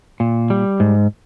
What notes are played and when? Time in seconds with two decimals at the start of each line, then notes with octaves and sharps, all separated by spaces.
0.20 A#2
0.50 G3
0.80 G#2